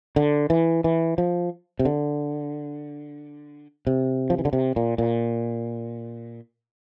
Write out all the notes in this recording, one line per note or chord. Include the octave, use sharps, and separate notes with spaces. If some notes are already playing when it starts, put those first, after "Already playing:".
D3
E3
E3
F3
C3
D3
C3
F3
E3
D3
C3
A#2
A#2